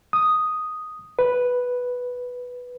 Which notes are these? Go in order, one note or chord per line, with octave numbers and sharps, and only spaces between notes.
D#6
B4